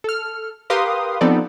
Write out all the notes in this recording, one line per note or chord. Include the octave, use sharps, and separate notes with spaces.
A4 F6
G4 A#4 B4 F5 C6 D#6
F3 B3 C4 D#4 A4 D5